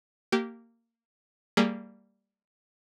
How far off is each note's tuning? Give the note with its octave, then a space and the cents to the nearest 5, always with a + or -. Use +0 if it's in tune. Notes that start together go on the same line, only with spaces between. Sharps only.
A#3 -15 G4 -20
G3 +0 A#3 -20 G#4 -5